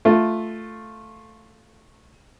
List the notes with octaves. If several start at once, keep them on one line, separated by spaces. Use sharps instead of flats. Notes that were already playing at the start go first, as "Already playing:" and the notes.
A3 F4